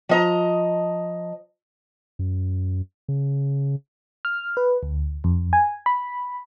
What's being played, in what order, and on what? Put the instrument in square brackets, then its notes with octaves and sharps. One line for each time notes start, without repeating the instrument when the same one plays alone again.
[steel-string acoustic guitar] F3 D#5 A#5
[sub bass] F#2
C#3
[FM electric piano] F6
B4
D2
F2
G#5
B5